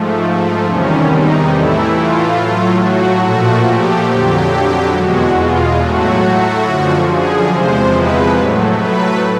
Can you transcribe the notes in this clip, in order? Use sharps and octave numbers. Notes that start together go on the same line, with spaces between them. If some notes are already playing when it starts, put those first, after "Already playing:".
Already playing: G#2 F3 A3
E2 C3 D#3 G3 C#4
D#4
A2 E3 A3 E4
F4
A2 F#3 A3
F#4
A#2 F3 A3 F#4
G4
F2 D3 F#3 G4
E2 B2 G#3 F#4
F4
A2 F#3 A3 F#4
F#2 D3 F3
G#4
E2 C3 F3 G#3 C5
B4
A2 F#3 A3
B4